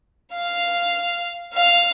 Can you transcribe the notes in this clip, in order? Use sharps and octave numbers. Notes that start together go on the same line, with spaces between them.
F5
F5